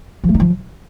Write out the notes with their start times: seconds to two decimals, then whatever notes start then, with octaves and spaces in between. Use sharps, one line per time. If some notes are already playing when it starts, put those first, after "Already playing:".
0.24 F3
0.29 A3
0.34 D#4
0.40 F3